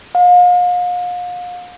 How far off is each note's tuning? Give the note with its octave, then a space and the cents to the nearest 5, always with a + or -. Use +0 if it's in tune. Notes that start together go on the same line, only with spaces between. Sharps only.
F5 +40